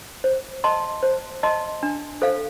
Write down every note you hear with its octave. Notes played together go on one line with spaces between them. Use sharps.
C5
D#5 A5 C6
C5
D#5 A5 C6
D4
A4 C5 F5